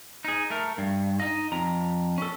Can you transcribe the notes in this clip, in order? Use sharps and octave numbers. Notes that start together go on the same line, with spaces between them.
D#4 G#4
A3 A#4
G2
D#4 D#5
F2 A#5
C#4 A4